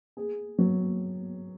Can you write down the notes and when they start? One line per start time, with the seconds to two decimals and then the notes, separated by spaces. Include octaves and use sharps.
0.17 G#4
0.58 F#3